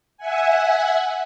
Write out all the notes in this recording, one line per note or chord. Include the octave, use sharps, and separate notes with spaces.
E5 F#5 G#5